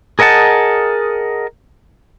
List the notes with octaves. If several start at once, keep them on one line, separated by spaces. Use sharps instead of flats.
G#4 A#4 D#5 F#5 A5